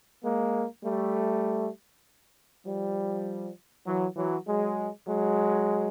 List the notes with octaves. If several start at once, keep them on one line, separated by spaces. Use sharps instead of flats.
G#3 A#3
G3 A3
F3 G3
E3 F#3
E3 F#3
F#3 G#3
F#3 G#3